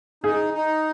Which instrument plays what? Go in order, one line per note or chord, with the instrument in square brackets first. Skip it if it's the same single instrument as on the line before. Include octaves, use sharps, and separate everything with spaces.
[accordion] D#4 [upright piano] G#4
[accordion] D#4